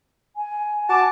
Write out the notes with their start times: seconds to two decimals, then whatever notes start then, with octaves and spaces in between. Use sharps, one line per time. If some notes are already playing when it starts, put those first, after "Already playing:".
0.36 G#5
0.89 F#4 A5 D6